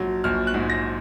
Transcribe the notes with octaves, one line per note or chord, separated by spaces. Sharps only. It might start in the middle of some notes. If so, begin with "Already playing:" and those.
Already playing: A#1 G#2 F#3
A#1 F6
F#6
G#2
A#6